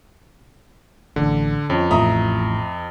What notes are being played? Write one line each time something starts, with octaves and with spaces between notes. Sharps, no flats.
A1 D3
F2 C#4
A1 A2 E5 A#5 D#6